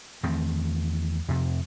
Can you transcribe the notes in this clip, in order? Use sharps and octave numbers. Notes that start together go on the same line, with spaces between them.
E2 D#3 A3 C4
F2 C3